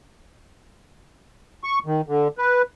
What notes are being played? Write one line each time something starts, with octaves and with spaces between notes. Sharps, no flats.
C#6
D#3
D3
B4